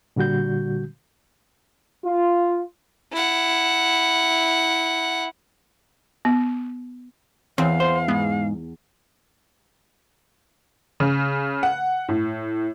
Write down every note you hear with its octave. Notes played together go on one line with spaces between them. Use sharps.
A#2 D3 G3 F#4 G6
F4
E4 F#5
B3
E2 C4 F5
C5
G#2 B3
C#3
F#5
A2